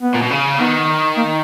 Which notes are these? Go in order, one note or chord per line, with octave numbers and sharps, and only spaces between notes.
B3
A#2
B2
C#3
D#3 B3
A#3